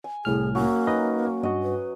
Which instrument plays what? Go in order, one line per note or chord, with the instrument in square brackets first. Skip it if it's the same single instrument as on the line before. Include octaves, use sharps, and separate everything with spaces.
[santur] G#5
[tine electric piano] C2 A2 F6 [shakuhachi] G#4
[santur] F#3 C#4 [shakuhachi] A#3
[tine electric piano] D#4 B4 D#5
[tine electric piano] G2 F#4 [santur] D#5
[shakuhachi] B4